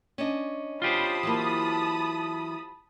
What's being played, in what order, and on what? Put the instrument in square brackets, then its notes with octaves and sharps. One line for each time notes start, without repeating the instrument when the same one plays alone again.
[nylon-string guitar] C#4 D4 D#5
[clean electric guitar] F4 G4 C5 [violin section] A5 B5 D#6
[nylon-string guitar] E3 F#3 A#3